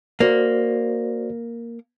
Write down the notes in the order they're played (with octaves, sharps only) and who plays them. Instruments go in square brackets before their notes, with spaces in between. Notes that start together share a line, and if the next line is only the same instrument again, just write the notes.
[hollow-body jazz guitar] A#3 [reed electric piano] F#4 C5 D5